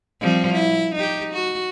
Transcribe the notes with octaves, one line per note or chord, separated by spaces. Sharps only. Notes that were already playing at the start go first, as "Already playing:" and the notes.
F3 G3 C4
E4
D#4 G4
F#4